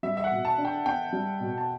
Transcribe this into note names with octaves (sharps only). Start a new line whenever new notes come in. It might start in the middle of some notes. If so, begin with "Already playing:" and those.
G3 E5
E5
F#5
B2
A5
D4
G5
B3 G5
G3
B2
A5